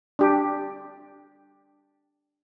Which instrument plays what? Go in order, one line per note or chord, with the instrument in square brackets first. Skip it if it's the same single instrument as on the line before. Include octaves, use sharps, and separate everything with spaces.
[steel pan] D4 G4